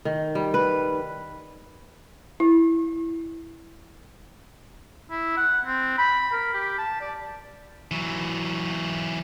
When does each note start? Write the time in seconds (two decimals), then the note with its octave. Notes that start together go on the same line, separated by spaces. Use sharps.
0.05 D#3
0.35 G3
0.54 B4
2.40 E4
5.10 E4
5.37 F#5
5.66 C4
5.98 B5
6.32 A#4
6.53 G4
6.78 A5
7.01 D5
7.91 E3 F#3